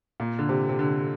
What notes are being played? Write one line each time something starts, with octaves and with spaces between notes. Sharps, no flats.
A#2
D3
C3
C3
D3